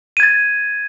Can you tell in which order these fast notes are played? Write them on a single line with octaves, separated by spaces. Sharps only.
D#7 G#6 A6